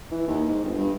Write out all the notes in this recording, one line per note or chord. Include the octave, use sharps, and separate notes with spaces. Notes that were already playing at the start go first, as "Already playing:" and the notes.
E3
D#2
G#2
G1
G2